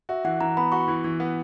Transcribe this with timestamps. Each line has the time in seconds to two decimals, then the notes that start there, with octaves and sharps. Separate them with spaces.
0.09 F#4 E5
0.24 E3 F#5
0.41 E3 A#5
0.57 B3 B5
0.72 F#4 C#6
0.88 E3
1.04 E3
1.20 B3